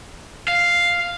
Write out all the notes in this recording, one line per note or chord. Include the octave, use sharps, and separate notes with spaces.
F5